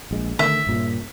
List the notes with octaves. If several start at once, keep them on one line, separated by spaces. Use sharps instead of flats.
A#1 G#3
D3 D#3 A3 E5
G2 A#2 C#3